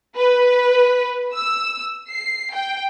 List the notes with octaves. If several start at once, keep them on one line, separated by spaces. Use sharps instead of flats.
B4
E6
C7
G5